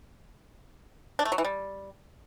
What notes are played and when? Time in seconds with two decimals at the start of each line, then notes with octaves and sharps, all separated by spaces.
1.19 D4
1.25 A3
1.32 F#3
1.38 E3
1.45 G3